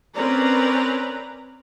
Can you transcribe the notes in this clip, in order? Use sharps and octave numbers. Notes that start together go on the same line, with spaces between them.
C4 C#4 A#4 B4 D5 A#5